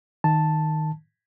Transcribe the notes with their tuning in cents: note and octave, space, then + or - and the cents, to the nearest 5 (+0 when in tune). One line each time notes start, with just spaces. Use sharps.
D#3 +0 A5 +0